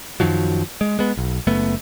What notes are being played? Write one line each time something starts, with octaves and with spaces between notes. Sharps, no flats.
F#2 D#3 F3 F#3
G#3
G#3 B3
B1
F#1 A3 B3